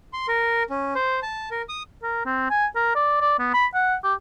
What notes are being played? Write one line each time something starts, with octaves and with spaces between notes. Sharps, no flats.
C6
A#4
C#4
C5
A5
A#4
D#6
A#4
C4
G#5
A#4
D5
D5
B3
B5
F#5
G4